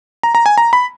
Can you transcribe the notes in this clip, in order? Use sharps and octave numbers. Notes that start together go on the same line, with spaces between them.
A#5
A#5
G#5
A#5
B5